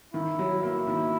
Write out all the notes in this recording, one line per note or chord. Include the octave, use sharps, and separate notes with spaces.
D#3 E4
F#3
A#3 E4
D#3